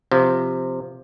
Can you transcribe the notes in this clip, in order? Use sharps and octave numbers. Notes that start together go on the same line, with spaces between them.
C3 F3